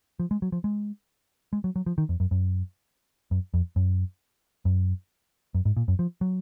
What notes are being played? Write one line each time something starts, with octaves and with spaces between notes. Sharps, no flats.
F3
G#3
F#3
F3
G#3
G#3
F#3
F#3
F3
D#3
F2
F#2
F#2
F#2
F2
F#2
F#2
F#2
G#2
A#2
F#2
F3
F#3